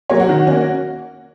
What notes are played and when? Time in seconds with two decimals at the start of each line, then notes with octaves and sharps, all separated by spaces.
0.10 F#3 A#3 C#5
0.20 F#4
0.29 D#3
0.47 A#3 C#4